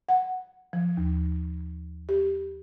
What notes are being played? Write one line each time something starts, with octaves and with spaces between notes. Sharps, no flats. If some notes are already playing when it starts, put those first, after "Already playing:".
F#5
F3
D#2
G4